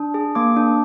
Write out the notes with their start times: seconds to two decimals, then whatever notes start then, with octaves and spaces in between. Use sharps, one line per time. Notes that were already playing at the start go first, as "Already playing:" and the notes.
Already playing: D4
0.14 G#4
0.35 A#3 D6
0.57 D4